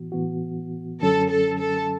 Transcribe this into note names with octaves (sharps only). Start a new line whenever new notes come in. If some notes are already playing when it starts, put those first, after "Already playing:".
Already playing: A2 E3 B3 F#4
A2 E3 B3 F#4
F#2 D3 F#3 C#4 A4
A4
A4